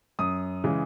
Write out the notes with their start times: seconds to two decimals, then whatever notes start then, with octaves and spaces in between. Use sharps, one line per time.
0.19 F#2 D#6
0.64 C#3 E3 G#3